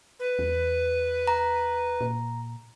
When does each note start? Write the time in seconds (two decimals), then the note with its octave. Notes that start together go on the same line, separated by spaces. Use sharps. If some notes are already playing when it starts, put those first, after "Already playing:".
0.20 B4
0.39 E2
1.27 A#5
2.01 A#2